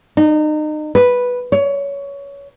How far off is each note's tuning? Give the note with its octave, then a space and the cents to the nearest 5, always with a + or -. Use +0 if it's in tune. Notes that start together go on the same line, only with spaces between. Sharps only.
D#4 -30
B4 -5
C#5 +20